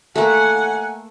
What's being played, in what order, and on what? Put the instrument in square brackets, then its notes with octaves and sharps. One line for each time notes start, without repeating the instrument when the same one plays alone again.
[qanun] A3 A#3 [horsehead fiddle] F#5 [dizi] G#5